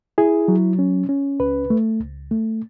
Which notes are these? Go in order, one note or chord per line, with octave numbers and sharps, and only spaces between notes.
E4 G#4
F#3
C#4
C#4
C#2 B4
A3
C#2
A3